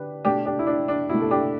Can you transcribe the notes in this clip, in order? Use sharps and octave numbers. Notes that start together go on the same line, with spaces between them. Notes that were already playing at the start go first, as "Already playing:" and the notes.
Already playing: D3 D4 G4 B4
B2 A3 D4 G4
D4 G4
E4
D4
D4
B2 A3 E4
A4
D4 G4